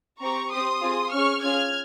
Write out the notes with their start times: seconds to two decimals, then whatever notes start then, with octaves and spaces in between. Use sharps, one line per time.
0.21 C4 G4 A#5 C#6
0.51 C4 G4 C6 D#6
0.82 C4 F4 G#4
1.12 C#4 G#4 C#6 F6
1.43 C#4 F4 G#4 F6 G#6